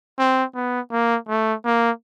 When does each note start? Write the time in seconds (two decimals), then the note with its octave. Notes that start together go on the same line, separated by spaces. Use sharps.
0.19 C4
0.55 B3
0.92 A#3
1.28 A3
1.65 A#3